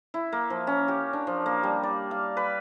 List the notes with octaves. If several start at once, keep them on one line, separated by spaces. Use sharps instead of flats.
E4
A#3
F3
C#4
G4
D4
F3
A#3
G3
D5
F5
B4